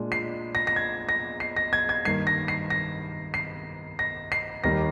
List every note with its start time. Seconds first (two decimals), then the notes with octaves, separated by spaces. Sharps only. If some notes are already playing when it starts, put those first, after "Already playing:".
Already playing: A#2 G#3 D4
0.12 C7
0.55 A#6
0.67 A#6
0.76 G#6
1.09 A#6
1.40 C7
1.56 A#6
1.73 G#6
1.89 G#6
2.05 G2 D#3 A#3 C7
2.27 A#6
2.48 C7
2.70 A#6
3.34 C7
3.99 A#6
4.32 C7
4.64 D#2 D#3 G3 A#3 A#6